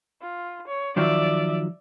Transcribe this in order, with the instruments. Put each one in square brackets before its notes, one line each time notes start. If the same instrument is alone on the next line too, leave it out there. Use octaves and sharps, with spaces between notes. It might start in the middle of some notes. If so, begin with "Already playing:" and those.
[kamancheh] F4
C#5
[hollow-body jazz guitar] D#3 F3 F#3 [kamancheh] D5 E5